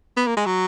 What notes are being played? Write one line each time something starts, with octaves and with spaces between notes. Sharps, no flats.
B3
A#3
G#3
F#3